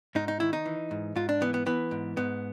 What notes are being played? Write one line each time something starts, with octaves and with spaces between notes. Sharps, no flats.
G#2 D#4
D#4
D#3 E4
D#4
E3
G#2
G#2 F4
D4
E3 B3
B3
E3 B3
G#2
G#2 B3